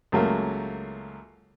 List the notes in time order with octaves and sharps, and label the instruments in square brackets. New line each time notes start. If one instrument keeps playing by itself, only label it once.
[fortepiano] C#2 F#3 A3 A#3